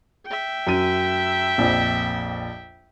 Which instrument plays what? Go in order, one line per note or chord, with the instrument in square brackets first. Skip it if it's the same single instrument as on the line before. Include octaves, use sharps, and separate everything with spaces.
[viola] E5 G5
[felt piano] F#2 D#7
A#1 F2